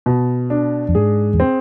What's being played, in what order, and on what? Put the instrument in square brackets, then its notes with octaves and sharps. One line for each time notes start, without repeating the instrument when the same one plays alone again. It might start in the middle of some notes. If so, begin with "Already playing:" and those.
[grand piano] B2
D4
[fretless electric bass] F2
[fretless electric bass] G#2 [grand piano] G#4
[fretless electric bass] E2
[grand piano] C4